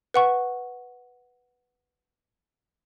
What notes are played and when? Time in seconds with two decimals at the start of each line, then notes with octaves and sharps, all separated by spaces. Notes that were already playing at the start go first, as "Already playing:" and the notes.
0.14 B4 F#5 C#6